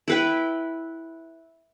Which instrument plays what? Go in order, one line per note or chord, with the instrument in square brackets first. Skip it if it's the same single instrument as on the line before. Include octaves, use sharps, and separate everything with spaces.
[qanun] E4 B4 G5